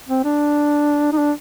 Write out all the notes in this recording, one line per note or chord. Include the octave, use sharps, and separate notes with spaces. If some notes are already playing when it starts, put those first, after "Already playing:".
C4
D4
D#4
D4